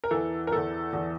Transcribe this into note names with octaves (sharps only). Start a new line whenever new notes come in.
A#4
E2 E3 A4
A#4
E2 E3 A4
E2 E3